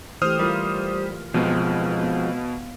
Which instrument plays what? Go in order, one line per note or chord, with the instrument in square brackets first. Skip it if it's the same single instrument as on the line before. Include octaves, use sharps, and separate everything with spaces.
[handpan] E3 A3 G4 [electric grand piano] C5 D#6 F6
[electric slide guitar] G3 [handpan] F4 A#4
[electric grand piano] B2 [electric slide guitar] F3 G#3 C4
[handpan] B3 F5